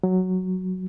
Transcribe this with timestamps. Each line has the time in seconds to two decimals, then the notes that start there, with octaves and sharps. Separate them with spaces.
0.04 F#3